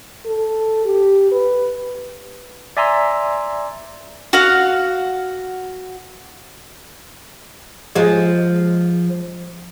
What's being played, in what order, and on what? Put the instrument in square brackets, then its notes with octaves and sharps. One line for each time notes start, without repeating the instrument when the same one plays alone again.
[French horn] A4
G4
B4
[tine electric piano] D5 E5 G#5 A#5 C6 E6
[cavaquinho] F#4 F5 F#5
[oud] F3 G#3